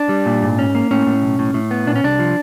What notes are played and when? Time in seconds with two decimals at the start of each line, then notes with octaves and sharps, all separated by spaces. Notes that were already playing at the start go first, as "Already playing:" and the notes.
Already playing: D4
0.09 G3
0.26 A#2
0.42 G#2
0.59 C#4
0.75 A#3
0.91 A2 C#4
1.07 A2
1.22 B1
1.39 A2
1.54 A2
1.71 B3
1.87 A#2 D4
1.96 C#4
2.04 C2 D4
2.19 F3